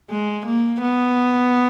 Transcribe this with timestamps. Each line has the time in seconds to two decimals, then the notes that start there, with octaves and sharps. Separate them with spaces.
0.10 G#3
0.46 A#3
0.82 B3